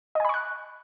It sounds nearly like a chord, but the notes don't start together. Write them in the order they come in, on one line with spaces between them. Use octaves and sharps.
D#5 G#5 B5 C#6 F#6